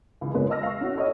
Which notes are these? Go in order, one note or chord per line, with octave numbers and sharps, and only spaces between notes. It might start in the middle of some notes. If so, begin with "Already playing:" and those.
C#2 E3
F#1 G#3 C#4 F4 B4
D#5 A5 E6 F6 A#6
F5 C#6
C#4 E4 F#4
A4 C#5 D#5